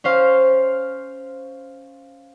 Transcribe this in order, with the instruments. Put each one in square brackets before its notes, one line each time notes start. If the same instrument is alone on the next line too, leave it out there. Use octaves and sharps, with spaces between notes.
[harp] C#4 C5 F5